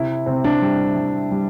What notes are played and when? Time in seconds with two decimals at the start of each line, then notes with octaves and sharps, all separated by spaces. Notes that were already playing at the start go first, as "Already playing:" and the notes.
Already playing: C3 E4
0.26 C3 C4
0.44 D4
0.62 G3
0.96 G3
1.31 G3